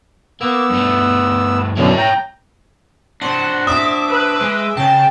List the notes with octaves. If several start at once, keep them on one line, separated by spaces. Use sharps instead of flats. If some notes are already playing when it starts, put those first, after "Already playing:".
A#3 B3 E6
G2 A3
F#2 B2 D3 E4 C#5
G5 A#5
D4 C5 F#5
E5 D6 D#6
B4
G#3
C#3 G5 A5